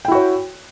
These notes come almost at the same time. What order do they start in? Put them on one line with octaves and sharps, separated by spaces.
G5 E4 F#4 C#5